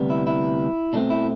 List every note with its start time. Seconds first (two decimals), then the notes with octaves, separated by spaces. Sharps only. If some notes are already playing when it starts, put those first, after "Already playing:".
Already playing: D2 C3 G3 B3
0.10 E4
0.27 E4
0.93 B2 A3 C4 D4
1.10 E4